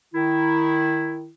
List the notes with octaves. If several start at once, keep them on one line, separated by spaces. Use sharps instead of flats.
D#3 E4